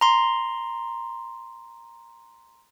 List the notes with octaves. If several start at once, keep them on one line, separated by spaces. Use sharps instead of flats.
A#5 C6